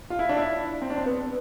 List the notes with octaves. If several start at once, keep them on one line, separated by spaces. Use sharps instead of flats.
F4
E4
D4
E4
C4
D4
C4
B3